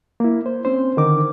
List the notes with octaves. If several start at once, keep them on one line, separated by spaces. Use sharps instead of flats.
A#3 E4
C5
C4 C#4 C5
D3 D#3 D#4 A#4 D6